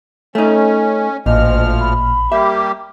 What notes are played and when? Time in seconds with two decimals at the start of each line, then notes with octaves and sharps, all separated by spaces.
0.35 A3 C#4 D#4
1.26 A1 D2 A#2 F3 D#5 F6
1.80 B5
2.32 G3 A#3 G4 E5